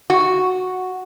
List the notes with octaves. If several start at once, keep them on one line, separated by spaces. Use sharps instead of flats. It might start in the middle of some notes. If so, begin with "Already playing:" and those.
F#4